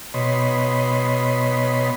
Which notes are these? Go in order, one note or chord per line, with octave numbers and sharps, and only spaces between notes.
B2 C#5 D#5 B5 C6